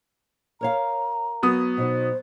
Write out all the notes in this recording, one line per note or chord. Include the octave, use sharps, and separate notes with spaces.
A#4 C#5 F5 A#5
F#3 B3 D#6
B2 D#4 F#4 C5